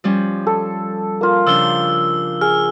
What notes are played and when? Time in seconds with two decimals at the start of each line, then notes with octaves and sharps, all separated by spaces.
0.04 F3 G3 C#4
0.47 A4
1.21 A#3 F4
1.47 C#3 F3 D4 E6 G7
2.41 G#4 F6